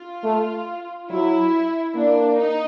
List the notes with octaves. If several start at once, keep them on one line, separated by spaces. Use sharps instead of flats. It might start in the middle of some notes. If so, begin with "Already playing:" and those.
Already playing: F4
A3
F#3 E4
A#3 D4
D#4